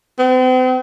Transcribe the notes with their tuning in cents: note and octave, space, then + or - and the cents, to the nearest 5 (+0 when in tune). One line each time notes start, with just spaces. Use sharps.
C4 -40